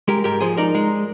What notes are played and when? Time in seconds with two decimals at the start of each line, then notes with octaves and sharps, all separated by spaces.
0.08 G#3 G4 A#4
0.24 G#2 G4 A#4
0.41 F3 G#4 C5
0.57 D#4 A#4 D5
0.75 G#3